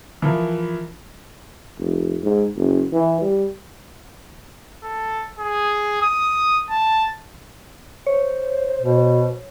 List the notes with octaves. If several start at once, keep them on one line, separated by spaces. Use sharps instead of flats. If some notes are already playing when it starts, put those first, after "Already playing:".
E3 F3 A#4
F1
G#2
F#1
E3
G3
A4
G#4
D#6
A5
C5 C#5
B2